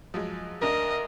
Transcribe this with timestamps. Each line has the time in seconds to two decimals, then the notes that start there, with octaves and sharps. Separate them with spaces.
0.14 F3 F#3 G#3
0.62 D2 D4 A#4 D#5